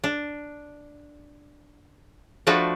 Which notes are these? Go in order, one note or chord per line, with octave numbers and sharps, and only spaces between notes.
D4
F3 A3 D4 F#4 B4